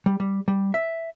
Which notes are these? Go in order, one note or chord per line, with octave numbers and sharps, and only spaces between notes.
G3
G3
G3
E5